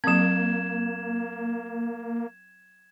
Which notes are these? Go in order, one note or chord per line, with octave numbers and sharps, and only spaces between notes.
F#3 A#3 C4 G#6 E7